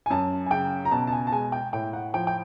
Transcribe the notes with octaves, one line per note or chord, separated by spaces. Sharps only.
G#5
F#2 A5
G#5
C#3 G5
A#5
B2 A5
A5
G#5
A5
G#3 G#5
G5
A2 G5
F#5
F3 G5
G5